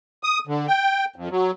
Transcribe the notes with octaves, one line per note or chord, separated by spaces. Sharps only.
D#6
D3
G5
F2
F#3